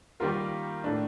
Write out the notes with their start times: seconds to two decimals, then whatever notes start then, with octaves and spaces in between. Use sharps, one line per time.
0.20 D#3 G3 A#3 F4 A#4
0.84 A2 A3 D4